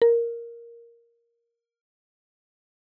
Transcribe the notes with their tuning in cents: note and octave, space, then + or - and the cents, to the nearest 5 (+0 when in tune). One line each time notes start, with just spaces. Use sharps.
A#4 +5